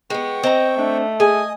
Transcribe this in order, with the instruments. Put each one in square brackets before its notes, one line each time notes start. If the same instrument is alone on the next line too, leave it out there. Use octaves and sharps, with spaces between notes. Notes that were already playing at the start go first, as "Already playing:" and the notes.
[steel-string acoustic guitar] G#3 B3 [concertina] G5 C#6
[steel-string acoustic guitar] C4 A#5 [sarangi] D#5
[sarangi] A3 [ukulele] D4
[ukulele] G#4 [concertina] D#5 D#6 [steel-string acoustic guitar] G#5